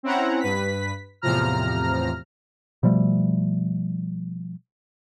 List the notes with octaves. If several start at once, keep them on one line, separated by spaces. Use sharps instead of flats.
C4 C#4 E4 F#5 A#5
G2 B4 B6
E2 A2 C3 F3 A#5 F6
B2 F3 G3 A3